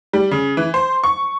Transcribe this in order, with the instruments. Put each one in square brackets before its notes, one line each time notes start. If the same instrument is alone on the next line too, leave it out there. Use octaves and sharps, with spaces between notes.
[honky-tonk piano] G3
C#3
E3
C5
C#6